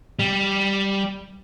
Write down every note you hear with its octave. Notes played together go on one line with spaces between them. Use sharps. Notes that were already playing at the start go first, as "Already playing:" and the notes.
G3